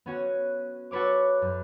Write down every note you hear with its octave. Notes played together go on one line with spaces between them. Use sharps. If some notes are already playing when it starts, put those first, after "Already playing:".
B3 C#4 F#4
F#4 A4 B4 C#5 D6
F#2